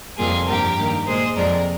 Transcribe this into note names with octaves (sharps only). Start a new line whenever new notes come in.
F2 C3 G3 A#3 F4 G#4
G2 F3 A#3 G4 A#4
G2 D#3 A#3
A#2 G#3 G#4 C5
F2 C3 F3 G#3 A#4 D5